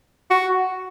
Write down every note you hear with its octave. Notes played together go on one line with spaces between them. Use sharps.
F#4